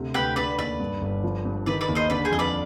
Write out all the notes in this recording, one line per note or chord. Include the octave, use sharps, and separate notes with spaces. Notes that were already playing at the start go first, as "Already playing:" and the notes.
Already playing: D2 C3
D2 G4 B4
D3 B4 D5
D#2 B4 D5
G2
G1
F3
G2
D#3 B4 D5
B4 D5
D#2
C5 D#5
D3 B4 D5
G#4 C5
F2 D#5
B4 D5